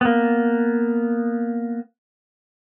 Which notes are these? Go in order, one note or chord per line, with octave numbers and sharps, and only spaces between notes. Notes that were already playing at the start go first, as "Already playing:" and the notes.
A#3 B3